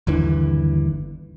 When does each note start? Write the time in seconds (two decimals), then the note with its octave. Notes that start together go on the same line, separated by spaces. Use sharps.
0.07 G1 D#2 D3 E3